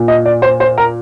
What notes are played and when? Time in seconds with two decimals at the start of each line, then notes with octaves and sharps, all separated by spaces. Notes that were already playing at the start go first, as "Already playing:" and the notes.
Already playing: A#2
0.08 D#5
0.25 D5
0.42 C5
0.60 C5
0.78 A#4